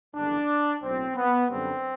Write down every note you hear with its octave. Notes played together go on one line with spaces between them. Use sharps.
F#1 E2 D3 G3 D4
B1 A2 F#3 C4
B3
F#2 D3 G3 C4